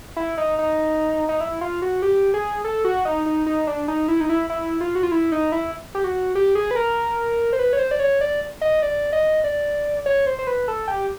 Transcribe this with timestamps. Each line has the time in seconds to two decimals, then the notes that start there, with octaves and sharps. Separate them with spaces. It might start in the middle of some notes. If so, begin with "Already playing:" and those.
0.16 E4
0.37 D#4
0.59 D#4
1.29 D#4
1.41 E4
1.61 F4
1.82 F#4
2.02 G4
2.34 G#4
2.64 A4
2.85 F#4
3.05 D#4
3.26 D#4
3.46 D#4
3.67 D4
3.88 D#4
4.08 E4
4.20 D#4
4.30 E4
4.50 E4
4.81 F4
4.95 F#4
5.03 F4
5.12 E4
5.32 D#4
5.52 E4
5.95 G4
6.04 F#4
6.35 G4
6.55 G#4
6.71 B4
6.76 A#4
7.53 C5
7.59 B4
7.73 C#5
7.79 C5
7.91 D5
8.00 C#5
8.21 D5
8.61 D#5
8.82 D5
9.13 D#5
9.44 D5
10.06 C#5
10.27 C5
10.39 C5
10.47 B4
10.68 A4
10.88 G4